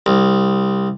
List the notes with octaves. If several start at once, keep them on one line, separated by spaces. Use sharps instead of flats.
C2